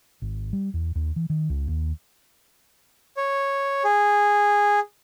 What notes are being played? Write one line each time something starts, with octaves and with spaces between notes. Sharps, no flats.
G#1
G3
E2
D#2
E3
D#3
C#2
D#2
C#5
G#4